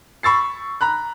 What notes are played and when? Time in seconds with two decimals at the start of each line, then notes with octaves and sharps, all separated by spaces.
0.23 B5 C#6 E6 A6 C7
0.81 A#5 B5 F#6